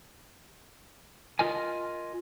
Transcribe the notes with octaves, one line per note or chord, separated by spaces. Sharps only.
F4 A#4 D#5 G#5